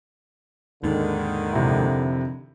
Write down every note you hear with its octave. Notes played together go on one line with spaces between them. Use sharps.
D#2 G#2 D3 D#3
F2 C3 E4